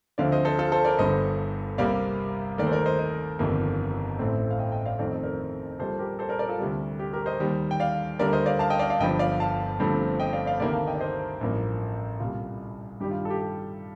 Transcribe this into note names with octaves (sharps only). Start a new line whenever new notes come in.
D2 D3 F3 C4 D5 F5
C5 D#5
A4 C5
F4 A4
A4 C5
A#4 D5
G1 G2 D3 C5 D#5
C2 C3 G3 A#3 D5 F5
D#2 D#3 A3 A#4 D5
C5
A#4 D5
C5 D#5
C5 D#5
G1 F2 C3 D#3 A#3
A1 A2 A3 C4
F5
D#5 G5
D#5 G5
D5 F5
F2 D#3 A3 C4 D5
D#5
A#4 D5
A#1 A#2 G3 A4 C5
G4 A#4
A4 C5
A#4 D5
A#4 D5
F4 A4
D2 C3 G3
G4
G4 A#4
C5 D#5
D#2 D#3 G3
G5
D5 F5
D2 D3 G3 A#3 A#4 D5
C5 D#5
D5 F5
F5 A5
D#5 G5
D5 F5
D5 F5
G1 G2 F3 D#5 G5
D5 F5
F5 A5
G1 G2 F3 A3 C4
D#5 G5
D5 F5
D5 F5
D2 C3 D#3 A#3 D5 F5
F5 A5
D#5 G5
D5
C5 D#5
A1 G2 F3 A#3
C2 A#2 G3 F4
G2 D#3 G3 G4
F4
A4
G4
G4